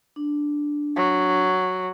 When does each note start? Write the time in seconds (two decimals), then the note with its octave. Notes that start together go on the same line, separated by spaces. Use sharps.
0.16 D4
0.97 F#3